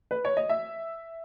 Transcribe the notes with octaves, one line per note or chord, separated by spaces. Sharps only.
B4
C#5
D#5
E5